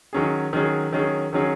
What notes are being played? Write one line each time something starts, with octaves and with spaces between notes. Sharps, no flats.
D#3 F#3 C#4 G#4
D#3 F#3 C#4 G#4
D#3 F#3 C#4 G#4
D#3 F#3 C#4 G#4